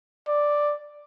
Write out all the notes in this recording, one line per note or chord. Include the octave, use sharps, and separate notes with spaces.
D5